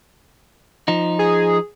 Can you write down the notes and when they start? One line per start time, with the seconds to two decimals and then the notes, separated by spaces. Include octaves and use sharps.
0.88 F3 D#4
1.19 G#4